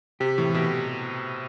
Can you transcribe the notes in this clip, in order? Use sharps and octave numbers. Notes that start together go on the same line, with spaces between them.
C3 G4
A2 E3
B2 G4